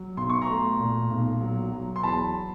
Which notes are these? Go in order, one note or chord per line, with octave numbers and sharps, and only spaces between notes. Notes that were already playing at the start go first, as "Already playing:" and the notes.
Already playing: F#3
B1 C6
C#6
A#5 C6
A3
A#2
B1
F#3
F#3
C6
E2 A5 B5